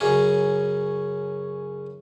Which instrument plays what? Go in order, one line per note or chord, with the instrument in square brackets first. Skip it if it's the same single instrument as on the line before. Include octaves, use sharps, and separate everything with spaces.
[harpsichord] F#2 C#3 C#4